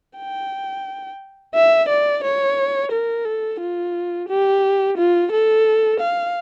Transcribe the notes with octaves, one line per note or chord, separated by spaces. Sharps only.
G5
E5
D5
C#5
A#4
A4
F4
G4
F4
A4
F5